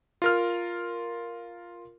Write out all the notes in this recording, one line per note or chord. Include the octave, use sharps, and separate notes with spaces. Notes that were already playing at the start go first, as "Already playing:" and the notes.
F4 A#4 F6